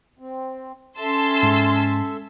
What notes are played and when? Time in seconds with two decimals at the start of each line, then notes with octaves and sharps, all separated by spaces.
0.19 C4
0.99 C#4 A4 E5 A5 C6 E6
1.43 G#2